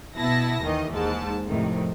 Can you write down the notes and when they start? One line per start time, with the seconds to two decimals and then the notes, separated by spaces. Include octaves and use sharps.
0.17 B2 B3 E4 A5 A#6
0.62 D#2 D#3 E3 D#5
0.92 D#2 G#2 A5
1.47 F2 A2 C3 D#3